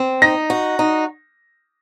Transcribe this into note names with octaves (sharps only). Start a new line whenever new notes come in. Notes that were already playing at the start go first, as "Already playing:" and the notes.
Already playing: C4
D#4 A#6
F#4
D#4